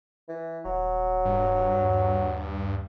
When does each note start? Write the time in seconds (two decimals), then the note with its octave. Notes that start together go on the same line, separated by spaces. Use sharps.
0.28 E3
0.65 D#1 F#3
1.25 G2
1.81 D#2